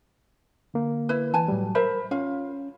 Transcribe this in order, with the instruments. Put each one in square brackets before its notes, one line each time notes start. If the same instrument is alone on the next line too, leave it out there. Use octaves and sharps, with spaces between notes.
[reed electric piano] D3 A#3
[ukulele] E4 B4
[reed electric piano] E3 [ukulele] B4 G#5 A5
[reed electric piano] A2 F#3 G3
[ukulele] A#4 C5 E5 [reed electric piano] B5
[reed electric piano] C#4 [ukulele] F4 F5